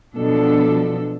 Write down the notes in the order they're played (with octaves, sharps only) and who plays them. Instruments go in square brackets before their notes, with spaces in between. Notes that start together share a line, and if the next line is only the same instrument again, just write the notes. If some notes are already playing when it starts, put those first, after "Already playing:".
[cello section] B2 F3 F#3 B3 D4 A4